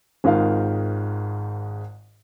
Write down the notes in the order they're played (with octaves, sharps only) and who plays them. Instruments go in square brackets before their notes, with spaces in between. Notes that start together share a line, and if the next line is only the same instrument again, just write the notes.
[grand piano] G#1 G#2 D#3 F4 F5